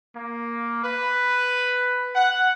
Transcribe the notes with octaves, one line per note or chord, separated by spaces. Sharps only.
A#3
B4
F#5